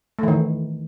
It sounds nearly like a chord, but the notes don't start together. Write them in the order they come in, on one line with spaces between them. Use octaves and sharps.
A3 E3 D#3